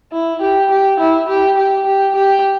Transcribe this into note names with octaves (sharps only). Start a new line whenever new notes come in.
E4
G4
G4
E4
G4
G4
G4
G4